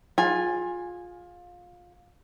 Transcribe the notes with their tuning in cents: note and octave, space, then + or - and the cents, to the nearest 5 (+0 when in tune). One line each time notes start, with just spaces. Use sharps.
F4 +20 G#4 +0 G#5 -10